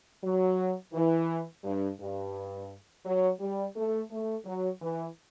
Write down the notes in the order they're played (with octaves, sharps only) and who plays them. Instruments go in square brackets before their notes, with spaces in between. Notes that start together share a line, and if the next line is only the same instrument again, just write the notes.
[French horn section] F#3
E3
G2
G2
F#3
G3
A3
A3
F#3
E3